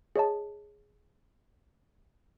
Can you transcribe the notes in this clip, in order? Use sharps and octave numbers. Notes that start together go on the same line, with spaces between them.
G#4 C#5 D#5 A5